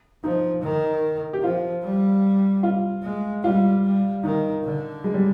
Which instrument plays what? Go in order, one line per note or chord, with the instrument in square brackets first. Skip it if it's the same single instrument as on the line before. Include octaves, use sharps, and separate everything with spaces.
[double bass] F3 [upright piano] D#4
[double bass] D#3
[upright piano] G4
[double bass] F3 [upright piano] F4
[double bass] G3
[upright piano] F4
[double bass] G#3
[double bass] G3 [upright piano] F4
[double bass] G3
[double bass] D#3 [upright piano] D#4
[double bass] D3
[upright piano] G#3
G3